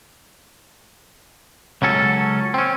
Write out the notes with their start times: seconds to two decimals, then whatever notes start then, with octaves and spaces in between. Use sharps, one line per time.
1.82 C#2 F#3 C#4 A4
2.54 C4 C#4